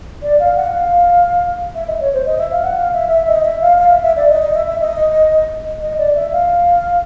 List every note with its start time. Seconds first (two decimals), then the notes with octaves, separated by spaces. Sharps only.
0.23 D5
0.40 F5
0.56 F#5
0.73 F5
1.75 E5
1.88 D#5
2.00 C#5
2.13 C5
2.26 D#5
2.39 E5
2.52 F5
2.64 F#5
2.76 F5
2.93 E5
3.11 E5
3.28 D#5
3.45 E5
3.62 F5
3.79 F5
3.91 E5
4.04 E5
4.17 D5
4.29 D#5
4.42 D#5
4.55 E5
4.67 E5
4.80 D#5
5.82 D#5
5.99 D5
6.16 E5
6.32 F5